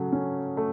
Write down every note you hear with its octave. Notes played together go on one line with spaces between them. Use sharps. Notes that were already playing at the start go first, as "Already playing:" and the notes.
Already playing: C#3 F#3 A3
C#4
A3